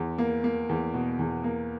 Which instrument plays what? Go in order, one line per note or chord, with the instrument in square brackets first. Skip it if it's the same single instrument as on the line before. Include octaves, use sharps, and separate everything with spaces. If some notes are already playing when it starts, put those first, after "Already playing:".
Already playing: [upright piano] E2
A#3
A#3
E2
B2
E2
A#3